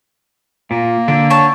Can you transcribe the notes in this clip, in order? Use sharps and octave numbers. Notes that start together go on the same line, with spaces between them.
A#2 A#3
D3 D4
C#5 A5